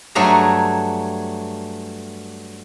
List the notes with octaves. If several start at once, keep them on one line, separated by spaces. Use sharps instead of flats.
G2 F#3 A3 G#4 A#5